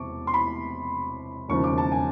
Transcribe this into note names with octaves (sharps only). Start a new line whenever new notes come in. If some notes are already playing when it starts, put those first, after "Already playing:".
Already playing: E1 E2 C3 A5 C#6 D6
C6
B5
E1 D#2 C#3 F3 C#6
D6
A5
G#5